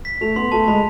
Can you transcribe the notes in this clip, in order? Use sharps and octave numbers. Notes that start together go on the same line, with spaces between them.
B6
A3 F7
B3 C6
A3 A5
G#3 B5